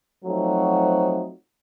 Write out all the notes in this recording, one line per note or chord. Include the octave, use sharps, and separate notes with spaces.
F3 F#3 A3 C4 D#4 F#4